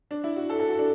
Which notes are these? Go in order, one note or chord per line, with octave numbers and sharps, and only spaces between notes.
D4
E4
F#4
A4
A4
F#4
D4